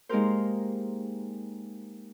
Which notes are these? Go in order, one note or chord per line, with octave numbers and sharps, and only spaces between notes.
G#3 A#3 D#4 G4 A#4 C5